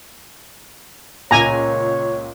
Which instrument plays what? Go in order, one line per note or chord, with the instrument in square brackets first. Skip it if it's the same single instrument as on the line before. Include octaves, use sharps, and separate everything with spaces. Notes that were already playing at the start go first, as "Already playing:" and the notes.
[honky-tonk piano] C#2 A#2 [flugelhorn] C#5 [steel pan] G#5 A#5